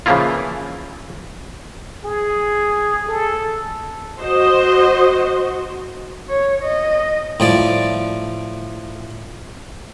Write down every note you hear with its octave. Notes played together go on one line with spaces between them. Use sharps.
C#3 E3 F3 A#3 E4 F4
G#4
A4
F#4 C5 D#5
C#5
D#5
A2 F3 D5